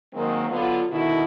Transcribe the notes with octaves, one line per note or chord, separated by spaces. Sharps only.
D#3 F#3 G#3 A#3 C4
D3 F#3 B3 F4
B2 D3 D#3 E4 F#4